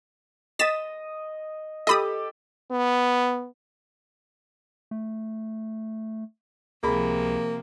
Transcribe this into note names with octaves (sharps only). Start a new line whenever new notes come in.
D#5 D#6 A6 B6 E7
G4 A4 D#5 B5 D#6
B3
A3
C#2 C3 F3 A#3 G#4 B5